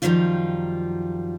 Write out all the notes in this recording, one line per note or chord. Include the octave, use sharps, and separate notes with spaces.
F#2 A#2 D#3 F3 G3 F4